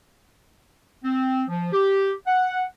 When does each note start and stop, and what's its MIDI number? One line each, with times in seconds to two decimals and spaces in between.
1.03 1.42 60
1.49 1.70 53
1.72 2.11 67
2.26 2.63 78